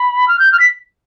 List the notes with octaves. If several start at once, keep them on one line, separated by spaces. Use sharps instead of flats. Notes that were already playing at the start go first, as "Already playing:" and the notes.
Already playing: B5
F6
G6
F6
B6